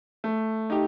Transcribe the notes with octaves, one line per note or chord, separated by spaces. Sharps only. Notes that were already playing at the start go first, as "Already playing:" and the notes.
A3
D#4 G4